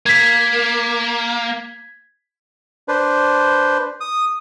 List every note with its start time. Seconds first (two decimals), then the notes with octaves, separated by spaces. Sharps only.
0.06 A#3 G#6 B6
2.88 D4 B4 C5
4.01 D#6